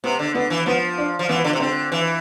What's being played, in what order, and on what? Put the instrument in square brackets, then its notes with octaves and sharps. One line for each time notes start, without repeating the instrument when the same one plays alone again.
[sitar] C3 [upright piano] B3
[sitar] D3
[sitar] D3 [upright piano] B3
[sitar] E3
[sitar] F3 [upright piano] B3
[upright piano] D4
[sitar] F3
[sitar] E3 [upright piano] B3
[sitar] D3
C3
[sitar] D3 [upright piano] C4
[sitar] E3